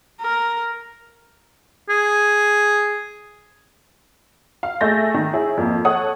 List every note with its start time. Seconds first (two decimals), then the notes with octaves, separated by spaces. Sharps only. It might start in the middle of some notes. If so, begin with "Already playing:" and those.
0.21 A#4
1.89 G#4
4.63 F5
4.81 A3 G#4 E5 G6 A6 A#6
5.14 D#3
5.33 E4 G#4 C#5
5.57 F2 A#3
5.85 A4 C#5 F#5 D#6